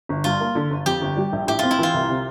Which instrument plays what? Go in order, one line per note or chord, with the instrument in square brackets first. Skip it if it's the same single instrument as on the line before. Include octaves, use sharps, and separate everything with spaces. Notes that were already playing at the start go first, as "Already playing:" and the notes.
[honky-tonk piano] G1
[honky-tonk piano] G2 [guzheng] F4
[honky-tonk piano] A#3
D3
G1
[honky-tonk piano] F2 [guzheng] G4
[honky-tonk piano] G1
G3
A#1
[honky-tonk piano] A2 [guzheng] G4
[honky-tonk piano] C4 [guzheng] F4
[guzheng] E4
[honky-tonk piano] E3 [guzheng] F4
[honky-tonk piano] C2
C3